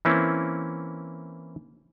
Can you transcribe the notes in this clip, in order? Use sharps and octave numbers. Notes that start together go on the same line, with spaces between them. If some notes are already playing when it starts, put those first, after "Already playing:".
E3 A#3 C4 C#4 E4